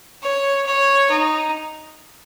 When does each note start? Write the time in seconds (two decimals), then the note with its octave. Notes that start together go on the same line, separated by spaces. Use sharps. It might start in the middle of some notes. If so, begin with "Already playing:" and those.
0.22 C#5
0.66 C#5
1.10 D#4